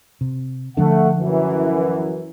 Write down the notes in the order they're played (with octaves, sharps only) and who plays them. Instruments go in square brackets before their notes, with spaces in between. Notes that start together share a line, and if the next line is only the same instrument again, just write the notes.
[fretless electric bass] C3
[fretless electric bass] D3 F3 D4 [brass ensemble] A3 F#5
[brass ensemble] F#2 E3